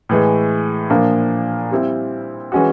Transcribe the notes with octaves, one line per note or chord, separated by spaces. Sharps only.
A2 E3 G#3
A#2 F3 A#3 D4
G3 C4 E4
E3 G#3 C#4 F#4